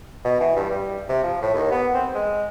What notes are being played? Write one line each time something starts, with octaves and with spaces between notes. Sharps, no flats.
B2
E3
G2
G3
C3
F3
A2
D#2
B3
C4
G#3